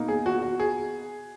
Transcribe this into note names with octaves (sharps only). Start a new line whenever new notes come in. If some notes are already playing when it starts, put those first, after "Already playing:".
Already playing: B2 A#3 D#4
G#4
F#4
F#4
G#4